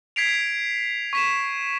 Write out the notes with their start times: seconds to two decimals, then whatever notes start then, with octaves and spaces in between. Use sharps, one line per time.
0.16 G#6 B6 C7 D7 F7
1.13 C#6 B6 E7